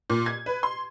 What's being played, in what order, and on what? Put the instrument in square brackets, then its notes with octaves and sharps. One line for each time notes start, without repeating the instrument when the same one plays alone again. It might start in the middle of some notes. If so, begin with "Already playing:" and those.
[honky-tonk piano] A#2
G#6
B4
C6